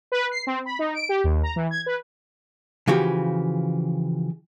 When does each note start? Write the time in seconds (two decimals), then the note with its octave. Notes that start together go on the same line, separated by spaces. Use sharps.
0.12 B4
0.32 C7
0.47 C4
0.66 B5
0.79 D#4
0.95 D7
1.09 G4
1.24 D#2
1.43 A#5
1.56 E3
1.71 G#6
1.86 B4
2.88 C#3 E3 F3 F#4 G4